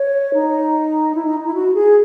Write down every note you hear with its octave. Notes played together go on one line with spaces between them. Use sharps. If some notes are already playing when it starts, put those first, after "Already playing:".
Already playing: C#5
D#4
E4
D#4
E4
F#4
G#4